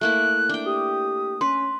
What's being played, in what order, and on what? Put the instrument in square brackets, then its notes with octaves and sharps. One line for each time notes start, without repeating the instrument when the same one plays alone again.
[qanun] A3 A#3 E4 [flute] F#6
[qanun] D4 G5
[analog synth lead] G4 [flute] D#6
[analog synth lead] C#4 [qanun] B4 [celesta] C6